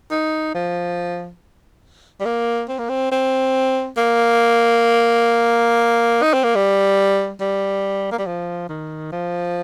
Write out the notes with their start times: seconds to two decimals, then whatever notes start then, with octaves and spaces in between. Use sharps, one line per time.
0.11 D#4
0.54 F3
2.20 G3
2.25 A#3
2.69 C4
2.79 A#3
2.89 C4
3.12 C4
3.97 A#3
6.22 D#4
6.34 C4
6.44 A#3
6.55 G3
7.41 G3
8.12 A#3
8.18 G3
8.26 F3
8.69 D#3
9.12 F3